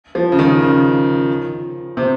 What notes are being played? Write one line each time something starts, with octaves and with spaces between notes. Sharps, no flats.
F3
C#3
D#3
C#3
C3